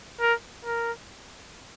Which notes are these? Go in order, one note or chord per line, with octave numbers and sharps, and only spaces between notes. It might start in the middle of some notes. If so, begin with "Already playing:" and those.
A#4
A#4